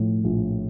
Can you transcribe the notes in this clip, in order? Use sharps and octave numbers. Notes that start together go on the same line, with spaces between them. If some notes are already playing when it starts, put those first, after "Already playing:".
Already playing: A2 F3
A#1